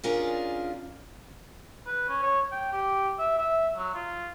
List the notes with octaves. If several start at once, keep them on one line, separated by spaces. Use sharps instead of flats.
C#4 D4 F4 G#4 A#4 D5
B4
C#4
C#5
G5
G4
E5
E5
F#3
F4